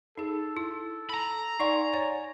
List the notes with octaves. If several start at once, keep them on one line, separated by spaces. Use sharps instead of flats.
D#4 G#4 A4
E4
A#5 B5
D#4 D5 F#5 G#5 C6 C#6
C#5 F#5